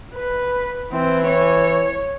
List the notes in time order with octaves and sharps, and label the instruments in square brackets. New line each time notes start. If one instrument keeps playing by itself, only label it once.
[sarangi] B4
[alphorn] E3 [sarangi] C4
[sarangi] C#5